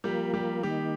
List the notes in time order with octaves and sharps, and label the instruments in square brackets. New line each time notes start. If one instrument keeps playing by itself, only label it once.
[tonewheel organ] F3 A#3 F4 A#4 [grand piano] G3 G4
[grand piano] G3 G4
[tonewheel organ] D#3 A#3 D#4 [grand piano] G3 G4